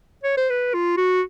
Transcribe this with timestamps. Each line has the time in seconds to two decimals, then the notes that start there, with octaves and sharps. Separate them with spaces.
0.24 C#5
0.37 C5
0.50 B4
0.74 F4
0.97 F#4